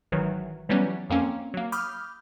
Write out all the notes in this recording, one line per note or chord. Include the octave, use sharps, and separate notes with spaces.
G#1 D#3 E3 F#3
E3 F#3 G3 B3 C#4
F2 A#3 C4 C#4
F#3 A#3
B5 D6 D#6 F6 G6